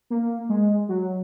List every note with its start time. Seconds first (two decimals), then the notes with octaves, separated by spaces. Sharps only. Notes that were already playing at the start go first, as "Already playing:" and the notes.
0.10 A#3
0.49 G#3
0.89 F#3